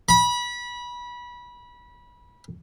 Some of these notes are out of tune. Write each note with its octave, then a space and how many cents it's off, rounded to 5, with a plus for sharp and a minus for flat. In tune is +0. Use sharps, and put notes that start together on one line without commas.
B5 -25